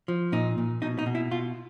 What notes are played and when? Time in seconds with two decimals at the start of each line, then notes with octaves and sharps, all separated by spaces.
0.08 F3
0.32 A#2 D#4
0.58 A#2
0.82 B2 D#4
0.99 D#4
1.06 B2
1.15 E4
1.31 B2 F4